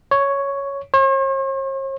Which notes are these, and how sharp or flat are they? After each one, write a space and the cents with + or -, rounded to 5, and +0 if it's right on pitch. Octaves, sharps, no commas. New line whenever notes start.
C#5 +5
C#5 -45